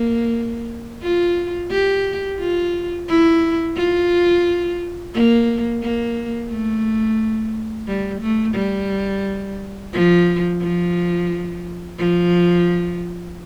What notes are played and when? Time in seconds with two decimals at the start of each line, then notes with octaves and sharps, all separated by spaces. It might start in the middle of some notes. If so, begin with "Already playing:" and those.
Already playing: A#3
1.03 F4
1.71 G4
2.39 F4
3.08 E4
3.76 F4
5.14 A#3
5.82 A#3
6.50 A3
7.87 G3
8.21 A3
8.55 G3
9.93 F3
10.61 F3
11.98 F3